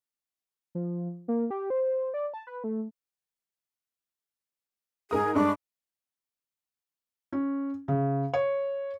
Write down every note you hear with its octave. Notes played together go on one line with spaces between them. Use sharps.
F3
A#3
G4
C5
D5
A5
B4
A3
G#2 G#4 A#4 D#6
G2 G#3 D4 C#6
C#4
C#3
C#5